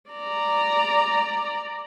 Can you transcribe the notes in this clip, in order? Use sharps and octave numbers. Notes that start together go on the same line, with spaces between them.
D5 A#5